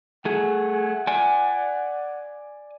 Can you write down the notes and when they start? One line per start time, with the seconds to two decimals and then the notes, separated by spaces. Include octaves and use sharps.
0.25 A3 G#4 F#5
1.07 D5 G#5